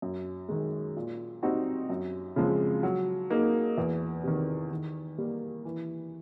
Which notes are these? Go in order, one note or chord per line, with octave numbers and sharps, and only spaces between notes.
F#2
D#3 G#3
A#2
G3 C4 D#4 F#4
F#2
C#3 F3 G#3 C4
F#3
A#3 D#4 G#4
E2
C3 D#3
D#3
G3 A#3
E3